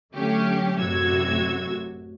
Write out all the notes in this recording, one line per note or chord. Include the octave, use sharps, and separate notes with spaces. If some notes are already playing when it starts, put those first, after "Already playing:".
D3 F#3 A3 C#4 G4
A1 F#2 C3 F#4 E6 G#6